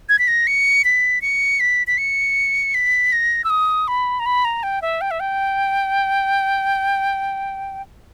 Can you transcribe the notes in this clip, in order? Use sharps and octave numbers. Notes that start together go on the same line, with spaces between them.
G#6
B6
A#6
C#7
B6
C#7
B6
B6
C#7
B6
A#6
E6
D#6
B5
A#5
B5
A#5
G5
E5
G5
E5
G5